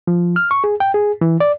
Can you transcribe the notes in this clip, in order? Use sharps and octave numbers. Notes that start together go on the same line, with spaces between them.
F3
F6
C#6
G#4
G5
G#4
E3
D5